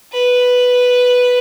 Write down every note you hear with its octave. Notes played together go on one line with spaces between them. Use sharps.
B4